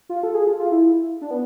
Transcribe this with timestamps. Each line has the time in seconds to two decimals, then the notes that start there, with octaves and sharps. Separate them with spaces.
0.09 F4
0.23 A4
0.34 G#4
0.47 F4
0.59 F4
0.71 E4
1.21 D4
1.31 B3